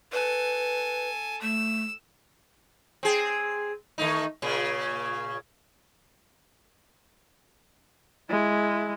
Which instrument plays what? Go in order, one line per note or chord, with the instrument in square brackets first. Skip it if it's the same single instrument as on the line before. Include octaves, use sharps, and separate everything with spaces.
[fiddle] A4 G#5 [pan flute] B4
[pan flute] A3 [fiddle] E6
[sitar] C4 G#4
D#3 A3 D#4
A#2 C#3
[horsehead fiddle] G#3 E4